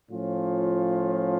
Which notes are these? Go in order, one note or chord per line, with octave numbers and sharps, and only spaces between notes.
A2 F3 C#4 F4